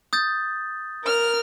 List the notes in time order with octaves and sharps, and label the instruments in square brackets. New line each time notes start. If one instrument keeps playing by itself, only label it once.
[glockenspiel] D#6 G6 A6
[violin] A#4 F6